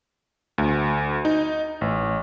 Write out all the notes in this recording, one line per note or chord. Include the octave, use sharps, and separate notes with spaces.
D2
D#4
A1